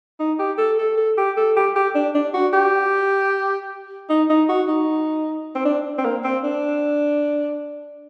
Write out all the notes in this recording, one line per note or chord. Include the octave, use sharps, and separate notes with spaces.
D#4
G4
A4
A4
A4
G4
A4
G4
G4
D4
D4
F#4
G4
D#4
D#4
F#4
D#4
C4
D4
C4
A#3
C4
D4